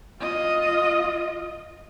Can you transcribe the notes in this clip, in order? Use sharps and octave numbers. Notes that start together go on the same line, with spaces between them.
F4 D#5